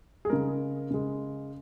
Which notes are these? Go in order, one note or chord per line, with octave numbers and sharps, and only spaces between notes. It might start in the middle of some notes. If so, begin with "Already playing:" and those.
G#4
C#3 G#3 A#4
C#3 G#3